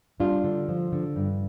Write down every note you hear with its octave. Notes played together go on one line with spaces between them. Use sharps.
G3 D4 F4
D3
F3
D3
G2